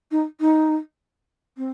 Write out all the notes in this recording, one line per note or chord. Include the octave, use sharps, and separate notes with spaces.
D#4
D#4
C4